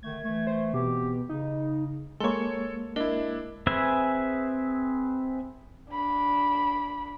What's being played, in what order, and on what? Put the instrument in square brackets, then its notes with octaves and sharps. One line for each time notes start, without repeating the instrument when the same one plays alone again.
[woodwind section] D3 D#3 A3 [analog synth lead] G#6
[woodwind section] E3 A3
[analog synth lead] C5
[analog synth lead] B2 [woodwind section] E3 C4 G4
[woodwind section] C#3 [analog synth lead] D#4
[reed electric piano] G#3 A#3 [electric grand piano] A4 C#5 [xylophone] C6 C#6
[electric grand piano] D4 E4 [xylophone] A#4 D#5
[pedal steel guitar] C4 G#4 B4 E5 G#5
[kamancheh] D4 B5